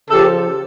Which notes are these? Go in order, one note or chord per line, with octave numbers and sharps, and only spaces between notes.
C#3 F3 G4 A4